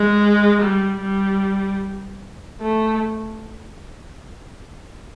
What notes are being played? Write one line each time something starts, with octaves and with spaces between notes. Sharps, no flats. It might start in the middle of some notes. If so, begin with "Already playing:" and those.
Already playing: G#3
G3
G3
A3